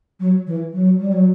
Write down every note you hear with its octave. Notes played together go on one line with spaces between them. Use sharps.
F#3
E3
F#3
G3
F#3